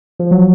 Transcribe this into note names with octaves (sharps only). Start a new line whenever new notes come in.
F3
F#3